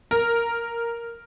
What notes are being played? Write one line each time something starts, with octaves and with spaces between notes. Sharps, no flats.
A#4